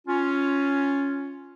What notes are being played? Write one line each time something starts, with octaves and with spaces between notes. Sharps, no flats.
C#4 F4